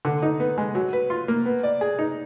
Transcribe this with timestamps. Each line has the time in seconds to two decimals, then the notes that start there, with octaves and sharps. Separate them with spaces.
0.05 D3
0.22 D#4
0.40 B3
0.58 G#3
0.75 F#3
0.93 B4
1.10 F4
1.28 A#3
1.46 B3
1.63 D5
1.81 G#4
1.99 D#4